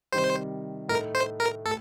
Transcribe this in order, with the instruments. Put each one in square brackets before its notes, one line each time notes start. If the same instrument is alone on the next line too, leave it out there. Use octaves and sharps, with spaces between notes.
[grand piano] C3 D#3 G3 [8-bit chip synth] C5
[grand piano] A2 A3 D#4 [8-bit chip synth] A#4
[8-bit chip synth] C5
A#4
[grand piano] A2 [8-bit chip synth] A4